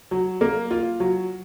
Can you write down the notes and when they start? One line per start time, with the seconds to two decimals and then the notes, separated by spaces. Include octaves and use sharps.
0.11 F#3
0.41 A#3
0.71 F4
1.00 F#3